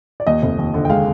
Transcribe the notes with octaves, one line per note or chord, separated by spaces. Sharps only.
D5
D#2 D#5
F1
D#2
D3
G5
G#3 F5